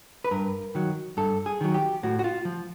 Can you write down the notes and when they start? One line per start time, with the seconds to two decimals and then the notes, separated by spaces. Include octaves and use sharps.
0.25 B4
0.31 G2 A#4
0.75 D#3 F#3
1.17 G2 A4
1.46 G#4
1.61 D#3 F#3
1.74 G4
2.03 A2 F#4
2.19 F#4
2.24 F4
2.45 F3